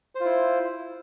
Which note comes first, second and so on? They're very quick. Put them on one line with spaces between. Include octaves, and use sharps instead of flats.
C5 F4 E4